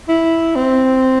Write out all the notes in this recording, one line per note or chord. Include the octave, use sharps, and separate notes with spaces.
E4
C4